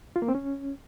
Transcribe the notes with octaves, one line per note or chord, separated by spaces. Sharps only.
F4
A#3
C4
C#4